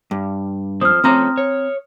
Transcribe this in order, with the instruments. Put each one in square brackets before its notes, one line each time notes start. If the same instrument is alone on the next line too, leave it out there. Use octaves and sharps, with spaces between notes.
[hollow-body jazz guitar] G2
[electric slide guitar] F3 C4 [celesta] D#6 F6
[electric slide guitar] F3 A3 C#4 [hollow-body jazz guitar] C4 A#5
[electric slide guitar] C#5